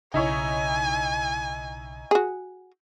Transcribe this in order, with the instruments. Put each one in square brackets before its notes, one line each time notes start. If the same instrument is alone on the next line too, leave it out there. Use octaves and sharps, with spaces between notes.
[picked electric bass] B1 C#3 [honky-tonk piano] D#4 E4 C#5 [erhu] G#5
[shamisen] F#4 G#4